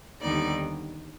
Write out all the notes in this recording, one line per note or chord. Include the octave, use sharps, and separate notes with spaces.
D#2 D3 G3 B3 D#4 D5